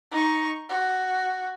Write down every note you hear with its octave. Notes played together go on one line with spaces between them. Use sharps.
D#4 C#6
F#4